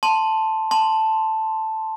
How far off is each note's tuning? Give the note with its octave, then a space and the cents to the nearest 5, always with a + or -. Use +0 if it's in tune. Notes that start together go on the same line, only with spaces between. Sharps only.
A5 +0 C6 +0
A5 +0 C6 -5